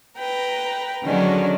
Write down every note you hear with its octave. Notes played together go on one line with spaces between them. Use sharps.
B4 G5 A#5
D3 D#3 F#3 G#3 C#4 D4